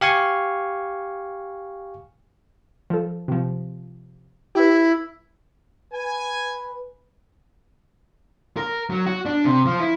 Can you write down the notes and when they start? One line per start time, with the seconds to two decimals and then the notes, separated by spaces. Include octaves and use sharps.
0.01 G4 F5 G#5 C#6
2.90 F3 A4
3.28 C3 F3
4.55 E4 G4 B4
5.93 B4 G#5
8.57 A#4
8.90 F#3
9.06 F#4
9.26 D4
9.45 C3
9.66 F3
9.80 E4